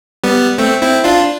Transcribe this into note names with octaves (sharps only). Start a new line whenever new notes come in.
G3 B3
A3 C4
C4 E4
D4 F4